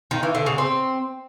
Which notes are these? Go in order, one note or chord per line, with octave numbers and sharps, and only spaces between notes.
D#3
E3
D3
C#3
C4